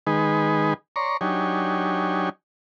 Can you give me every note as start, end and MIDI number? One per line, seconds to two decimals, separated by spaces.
0.07 0.74 51
0.07 0.74 56
0.07 0.74 63
0.07 0.74 68
0.07 0.74 71
0.96 1.17 73
0.96 1.17 74
0.96 1.17 82
0.96 1.17 84
0.96 1.17 85
1.21 2.29 54
1.21 2.29 62
1.21 2.29 63
1.21 2.29 67
1.21 2.29 73
1.21 2.29 80